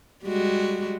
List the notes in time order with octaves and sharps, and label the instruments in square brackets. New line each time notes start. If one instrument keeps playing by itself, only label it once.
[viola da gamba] G3 G#3 F#4